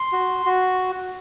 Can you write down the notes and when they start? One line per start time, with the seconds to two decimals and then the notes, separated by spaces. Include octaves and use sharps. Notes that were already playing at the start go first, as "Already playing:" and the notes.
Already playing: C6
0.12 F#4
0.46 F#4